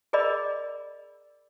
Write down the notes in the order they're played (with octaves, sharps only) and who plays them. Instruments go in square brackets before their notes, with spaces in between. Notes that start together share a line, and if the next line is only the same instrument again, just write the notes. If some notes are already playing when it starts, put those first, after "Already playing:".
[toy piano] G#4 A#4 D5 D#5 B5